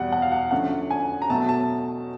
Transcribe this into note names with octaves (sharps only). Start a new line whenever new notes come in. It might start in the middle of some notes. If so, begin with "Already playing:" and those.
Already playing: E2 B2 G3 F#5
F#5
F5
F#5
D3 F3 A3 C#4 F#5
G#5
A#5
B2 F#3 A3 A5
A5